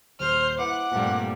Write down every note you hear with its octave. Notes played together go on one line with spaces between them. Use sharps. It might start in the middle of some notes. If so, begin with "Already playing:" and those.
D#1 C5 F6
E4 B4 C5 F#5 D6
G2 A#2 G3 A3 A#3 C4